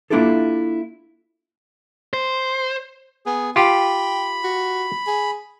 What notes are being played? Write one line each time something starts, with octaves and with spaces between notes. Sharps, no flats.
A#3 D4 E4 F4 G4 A4
C5
B3 G#4
F4 G4 G5 B5
F#4
G#4